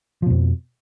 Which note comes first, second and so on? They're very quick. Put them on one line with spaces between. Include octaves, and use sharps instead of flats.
F3 B2 F2